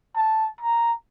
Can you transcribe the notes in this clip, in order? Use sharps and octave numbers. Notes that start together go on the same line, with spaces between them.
A5
A#5